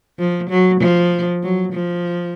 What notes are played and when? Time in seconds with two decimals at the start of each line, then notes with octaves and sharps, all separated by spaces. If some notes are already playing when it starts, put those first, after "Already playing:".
0.19 F3
0.50 F#3
0.81 F3
1.43 F#3
1.73 F3